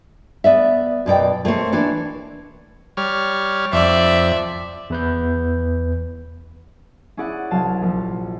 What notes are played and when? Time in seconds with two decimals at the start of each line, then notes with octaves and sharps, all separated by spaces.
0.44 B3 D5 E5
1.06 F#2 B2 D5 G5
1.45 A3 A#3 C4 C#5
1.73 E3 D4 E4 C#5
2.97 G3 C#5 F6
3.72 F2 D5 E5
4.90 E2 B4 G6
7.17 C#4 E4 G#4 D5 F#5
7.51 C2 F#3 F5 A5
7.82 A#1